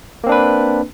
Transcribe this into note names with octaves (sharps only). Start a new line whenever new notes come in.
A#3 C4 D4 B4